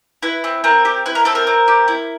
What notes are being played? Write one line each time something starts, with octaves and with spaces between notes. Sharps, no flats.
E4 B4
C4
C4 A#4
G4
E4 B4
A#4
C4 A4
A#4
C4
G4
E4